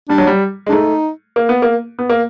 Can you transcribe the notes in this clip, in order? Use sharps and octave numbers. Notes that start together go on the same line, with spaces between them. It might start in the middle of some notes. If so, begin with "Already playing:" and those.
G3 D4
F#3
G3
G#3
D4
A3 D#4
A#3
B3
A#3
B3
A#3